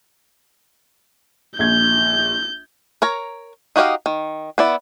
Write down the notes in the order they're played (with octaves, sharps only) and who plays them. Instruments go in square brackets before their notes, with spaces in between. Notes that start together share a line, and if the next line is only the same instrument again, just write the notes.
[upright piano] A#1 G#6 [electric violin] G6
[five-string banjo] A#4 C#5 A#5
D#4 F#4 G4 D#5 F5
D#3
B3 E4 D5